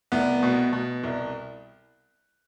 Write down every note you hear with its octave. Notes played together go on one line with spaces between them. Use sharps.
C2 B3
B2
B2
C2